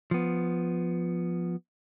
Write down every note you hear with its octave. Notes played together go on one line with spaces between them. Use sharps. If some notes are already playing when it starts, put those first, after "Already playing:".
F3 B3